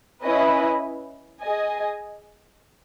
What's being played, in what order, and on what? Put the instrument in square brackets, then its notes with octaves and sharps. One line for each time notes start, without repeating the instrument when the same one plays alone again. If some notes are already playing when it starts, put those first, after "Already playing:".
[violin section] C#4 E4 B4 D#5
G#4 D#5 G#5